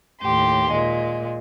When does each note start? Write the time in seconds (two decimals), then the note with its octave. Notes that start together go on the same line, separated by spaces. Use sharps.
0.21 D#2 A2 G4 C6
0.72 A#2 G#3